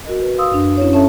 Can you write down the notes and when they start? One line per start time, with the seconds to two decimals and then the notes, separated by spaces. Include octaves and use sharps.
0.05 F#4 A#4 D#5
0.21 B4
0.38 F5 C6 D#6 E6
0.52 F#2 D4
0.77 C#4 E4 C#5
0.93 C#4 A4 C#5 E5 A5